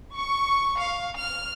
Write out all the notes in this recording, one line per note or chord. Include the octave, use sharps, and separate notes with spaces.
C#6
F5
F6